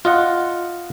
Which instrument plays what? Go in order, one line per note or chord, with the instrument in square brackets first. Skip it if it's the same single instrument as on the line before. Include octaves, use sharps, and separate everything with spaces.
[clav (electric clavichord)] F4 D#5 F#5